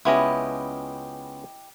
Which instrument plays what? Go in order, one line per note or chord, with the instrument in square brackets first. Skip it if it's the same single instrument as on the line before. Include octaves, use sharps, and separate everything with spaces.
[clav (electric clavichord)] C#2 B3 C#4 [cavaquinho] E4 G4 D#5